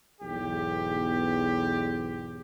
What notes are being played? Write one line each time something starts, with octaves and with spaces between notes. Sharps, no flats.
B1 E2 G#2 G4